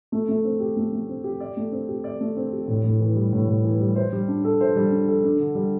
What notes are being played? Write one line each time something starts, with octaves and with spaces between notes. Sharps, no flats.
A3
A3
C4
G4
A3
A3
C4
G4
D5
A3
C4
G4
D5
A3
C4
G4
A2
A2
E3
G3
A2
A2
E3
G3
C5
G3
D4
A4
C5
G3
D4
A4
D4
D3
G3